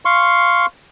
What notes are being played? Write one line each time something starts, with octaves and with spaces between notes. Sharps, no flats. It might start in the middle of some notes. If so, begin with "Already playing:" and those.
F5 C6 C#6